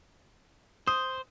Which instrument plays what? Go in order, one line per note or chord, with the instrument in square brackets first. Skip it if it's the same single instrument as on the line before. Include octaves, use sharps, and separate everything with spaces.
[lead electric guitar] C5 [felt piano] D#6